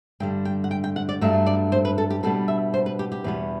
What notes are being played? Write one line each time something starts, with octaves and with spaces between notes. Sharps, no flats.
G2 D3 G3 G5
G5
F#5
G5
G5
F#5
D5
G2 F#3 A3 D4 E5
D5
C5
B4
A4
G4
B2 G3 B3 D4 A4
E5
C5
B4
G4
G4
E2 B2 G3 B3